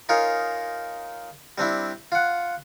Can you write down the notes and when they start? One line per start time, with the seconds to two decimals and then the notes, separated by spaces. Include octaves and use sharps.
0.09 D#4 F4 G#4 A#4 C#5
1.58 G3 C4 D4 E4
2.12 F4 F#5